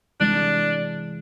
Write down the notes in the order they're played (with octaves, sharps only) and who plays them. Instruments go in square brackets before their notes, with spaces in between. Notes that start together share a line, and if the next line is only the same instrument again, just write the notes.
[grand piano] C3 E3 G#3 [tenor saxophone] D4